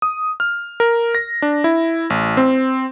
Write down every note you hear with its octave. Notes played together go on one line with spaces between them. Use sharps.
D#6
F6
A#4
A#6
D4
E4
A1
C4